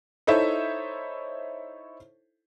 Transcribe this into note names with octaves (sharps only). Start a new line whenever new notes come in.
D#4 E4 A4 C5 C#5 E5